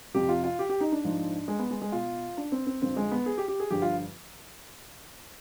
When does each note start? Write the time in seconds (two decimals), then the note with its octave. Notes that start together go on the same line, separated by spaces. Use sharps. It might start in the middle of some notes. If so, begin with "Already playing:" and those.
0.14 F2 C3 F3 G4
0.29 F4
0.44 F4
0.59 G4
0.69 G4
0.81 D#4
0.92 D4
1.04 G#2 F3
1.48 G#3
1.59 B3
1.71 G#3
1.82 G#3
1.92 B2 F4
2.37 D4
2.52 C4
2.67 C4
2.82 F2 D3 F3 C4
2.97 G#3
3.11 B3
3.26 G#4
3.38 G4
3.48 G4
3.60 G#4
3.70 G2 D3 F3 G4
3.82 F4